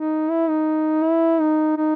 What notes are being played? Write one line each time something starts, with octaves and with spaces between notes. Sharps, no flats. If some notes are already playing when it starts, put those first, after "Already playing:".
Already playing: D#4
E4
D#4
E4
D#4
D#4